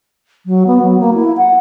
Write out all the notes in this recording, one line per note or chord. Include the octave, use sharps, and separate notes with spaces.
F#3
B3
F#3
A#3
E4
F#5